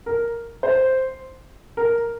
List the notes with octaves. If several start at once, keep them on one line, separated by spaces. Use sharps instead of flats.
A#4
C5
A#4